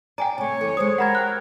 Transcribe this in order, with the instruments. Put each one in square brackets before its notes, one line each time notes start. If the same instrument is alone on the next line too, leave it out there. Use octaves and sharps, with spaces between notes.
[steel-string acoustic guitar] D5 [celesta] G5 G#5 A#5
[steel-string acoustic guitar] C3 A3 [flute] C#5 [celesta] G#5
[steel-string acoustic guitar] F#2 E3 [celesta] A4
[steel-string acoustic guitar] G#3 C5 [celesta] D#6
[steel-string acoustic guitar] G4 [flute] A#4 [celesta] F#5 B5 G#6
[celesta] G5 F#6